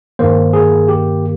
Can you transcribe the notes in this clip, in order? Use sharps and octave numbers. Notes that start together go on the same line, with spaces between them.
G2 D#3 A#3 C5
G#4
G4